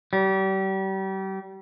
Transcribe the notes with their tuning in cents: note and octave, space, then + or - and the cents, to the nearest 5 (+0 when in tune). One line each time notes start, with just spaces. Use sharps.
G3 -35